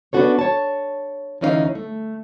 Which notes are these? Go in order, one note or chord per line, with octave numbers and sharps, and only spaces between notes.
B3 C#4 D4 F#4 A4 C#5
C#5 A5
D2 E3 C#4 D#4 D5 F5
A3